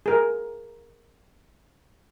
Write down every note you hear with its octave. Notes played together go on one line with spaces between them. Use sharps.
G#4 A#4